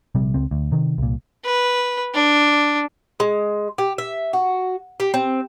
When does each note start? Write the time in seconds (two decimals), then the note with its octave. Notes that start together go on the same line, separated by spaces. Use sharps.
0.15 A#1 C3 G3
0.34 C#2 C4
0.51 D2
0.72 C3 D#3
0.98 C2 A#2
1.45 B4
2.14 D4
3.20 G#3
3.78 G4
3.98 E5
4.33 F#4
5.00 G4
5.14 C4